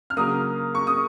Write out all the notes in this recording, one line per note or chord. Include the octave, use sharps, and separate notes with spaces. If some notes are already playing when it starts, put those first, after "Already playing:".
F6
C#3 F#3 A#3 D#6
C#6
D#6